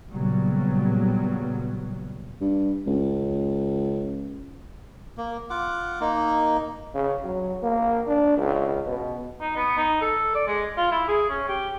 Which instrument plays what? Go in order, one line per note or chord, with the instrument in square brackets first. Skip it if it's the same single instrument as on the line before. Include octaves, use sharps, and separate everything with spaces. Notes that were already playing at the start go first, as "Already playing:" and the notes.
[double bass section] A#2 C#3 F#3 G3 B3
[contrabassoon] G2
C#2
[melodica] A#3
F4 F#5 D6
A#3 D#4
[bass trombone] C#3
F#3
A#3
D4
C#2
B2
[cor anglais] D#4
B3
D#4
A4
D5
G#3
F4
E4
G#4
C#4
G4